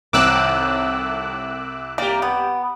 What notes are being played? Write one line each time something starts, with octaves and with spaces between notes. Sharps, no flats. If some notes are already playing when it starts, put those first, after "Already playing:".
C2 A2 D#3 C4 D6 E6 F#6
A#3 G4 D5
B3